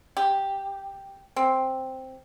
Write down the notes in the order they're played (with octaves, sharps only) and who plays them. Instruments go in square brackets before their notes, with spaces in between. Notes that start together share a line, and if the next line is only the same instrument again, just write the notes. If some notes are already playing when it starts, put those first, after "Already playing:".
[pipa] G4
C4